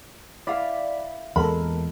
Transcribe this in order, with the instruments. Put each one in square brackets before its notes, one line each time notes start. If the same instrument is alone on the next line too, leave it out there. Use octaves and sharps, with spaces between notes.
[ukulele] E4 F5 [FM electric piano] D5 B5
[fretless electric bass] E2 A#2 G#3 [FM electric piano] A4 A#4 [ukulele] B5